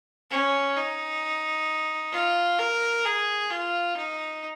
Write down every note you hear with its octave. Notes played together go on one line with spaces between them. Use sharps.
C#4
D#4
F4
A#4
G#4
F4
D#4